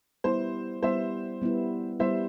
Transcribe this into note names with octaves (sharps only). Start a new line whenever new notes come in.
G3 B3 E4 C5
G3 B3 E4 C5 E5
G3 B3 E4
G3 B3 E4 C5 E5